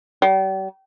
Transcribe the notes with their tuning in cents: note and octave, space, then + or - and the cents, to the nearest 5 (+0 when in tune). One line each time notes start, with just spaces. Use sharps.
G3 -40